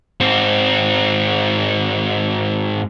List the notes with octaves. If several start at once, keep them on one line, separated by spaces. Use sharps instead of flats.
G#2 C4